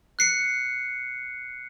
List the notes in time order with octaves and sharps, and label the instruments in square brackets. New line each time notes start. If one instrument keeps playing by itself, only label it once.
[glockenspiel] F#6 C7 C#7